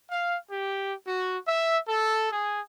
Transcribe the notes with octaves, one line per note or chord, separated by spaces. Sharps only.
F5
G4
F#4
E5
A4
G#4